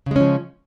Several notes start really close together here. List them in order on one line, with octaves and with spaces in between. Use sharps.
C#3 G#3 C#4 F3